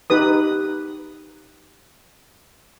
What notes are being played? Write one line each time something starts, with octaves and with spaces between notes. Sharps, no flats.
D#4 G4 B4 D#6